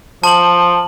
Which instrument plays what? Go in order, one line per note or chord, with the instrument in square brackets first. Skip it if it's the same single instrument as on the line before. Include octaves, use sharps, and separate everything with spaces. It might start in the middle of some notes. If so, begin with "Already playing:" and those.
[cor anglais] F3 [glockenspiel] A5 F#7